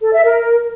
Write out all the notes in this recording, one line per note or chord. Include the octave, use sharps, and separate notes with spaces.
A4
E5
A#4